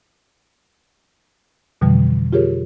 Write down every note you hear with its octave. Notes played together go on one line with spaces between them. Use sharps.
F2 B2 D3 E3 F3 G3
F4 G4 G#4 A#4 C#5